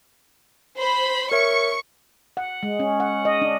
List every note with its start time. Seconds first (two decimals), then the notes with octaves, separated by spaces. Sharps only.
0.77 C5 B5
1.32 A#4 C#5 E5 C#6 C#7
2.37 F#5
2.63 G#3
2.79 C#4
3.00 F#5
3.25 D#5
3.42 D4